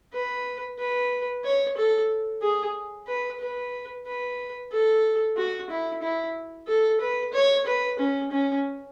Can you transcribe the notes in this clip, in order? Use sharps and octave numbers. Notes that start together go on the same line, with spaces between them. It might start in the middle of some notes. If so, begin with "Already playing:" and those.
B4
B4
C#5
A4
G#4
B4
B4
B4
A4
F#4
E4
E4
A4
B4
C#5
B4
C#4
C#4